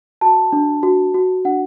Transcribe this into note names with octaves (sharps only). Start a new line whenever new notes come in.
F#4 A5
D4
F#4
F#4
D4 F#5